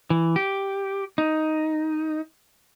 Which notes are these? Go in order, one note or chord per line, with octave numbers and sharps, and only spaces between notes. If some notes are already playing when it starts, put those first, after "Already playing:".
E3
G4
D#4